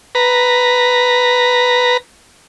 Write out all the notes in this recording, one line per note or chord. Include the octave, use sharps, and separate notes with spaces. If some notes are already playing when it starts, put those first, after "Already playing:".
B4 A#5